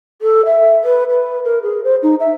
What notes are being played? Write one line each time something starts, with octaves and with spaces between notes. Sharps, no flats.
A4
E5
B4
B4
A#4
G#4
C5
D#4
E5